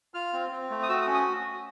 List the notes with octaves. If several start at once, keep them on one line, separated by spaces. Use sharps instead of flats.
F4 F6
C4
C4
A3
D#6
F#4 E6
D#6
C#4
D#6